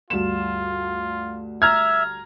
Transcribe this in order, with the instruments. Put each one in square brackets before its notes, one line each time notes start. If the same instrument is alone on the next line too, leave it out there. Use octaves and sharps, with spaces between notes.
[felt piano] D2 G2 E7 [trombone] F4
[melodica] E5 [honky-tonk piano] A#5 F6 G#6